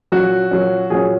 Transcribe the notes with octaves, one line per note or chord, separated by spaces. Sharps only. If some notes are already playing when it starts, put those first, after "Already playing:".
A#2 F#3 C#4 F#4
A#2 F#3 C#4
A#2 F#3 C#4 G#4